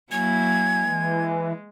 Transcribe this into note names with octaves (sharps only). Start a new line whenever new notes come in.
F#3 A#3 E4 G#5 G#6
E3 G#3